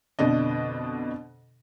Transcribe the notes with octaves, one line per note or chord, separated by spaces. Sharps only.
F2 B2 D3 D4 D#5